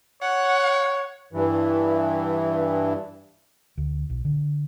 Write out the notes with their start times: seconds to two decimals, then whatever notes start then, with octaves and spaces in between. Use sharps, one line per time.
0.22 C#5 F#5
1.33 G2 E3
3.78 D2
4.10 B1
4.25 D3